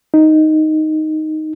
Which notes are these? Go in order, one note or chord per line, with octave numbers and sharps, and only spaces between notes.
D#4